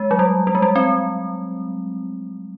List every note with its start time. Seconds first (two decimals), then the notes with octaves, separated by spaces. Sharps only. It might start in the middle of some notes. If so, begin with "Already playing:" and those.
Already playing: G#3
0.11 F#3
0.19 G3
0.47 G3
0.55 G#3
0.62 G3
0.76 C4